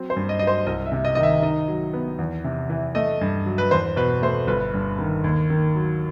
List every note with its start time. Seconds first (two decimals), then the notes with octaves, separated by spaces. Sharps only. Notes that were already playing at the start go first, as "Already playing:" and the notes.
Already playing: F#3 C4
0.10 C5
0.16 G2
0.29 D#5
0.39 F#3 D#5
0.47 C5
0.67 C2 D#5
0.86 E5
0.92 C3
1.05 D#5
1.15 D#3 D#5
1.23 E5
1.42 D#4 D#5
1.68 F#3
1.94 B3
2.19 E2
2.44 C3
2.70 E3
2.95 A3 D#5
3.21 G2
3.46 F#3
3.58 B4
3.71 E2 C5
3.96 B2 B4
4.22 A3 C5
4.47 G1 B4
4.74 G2
4.98 D#3
5.24 D#2
5.50 D#3
5.75 F#3